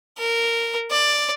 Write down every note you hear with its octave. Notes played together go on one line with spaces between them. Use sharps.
A#4
D5